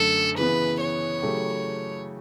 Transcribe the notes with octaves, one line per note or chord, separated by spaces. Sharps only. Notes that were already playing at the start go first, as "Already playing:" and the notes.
Already playing: F#2 D3 A3 A4
C#3 E3 B3 B4
C#5
C#3 F#3 A3 E4 G4